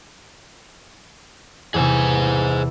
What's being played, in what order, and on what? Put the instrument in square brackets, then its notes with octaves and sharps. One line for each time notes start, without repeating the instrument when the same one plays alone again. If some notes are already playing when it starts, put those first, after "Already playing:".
[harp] E2 C3 [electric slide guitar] G#4 C5 G#5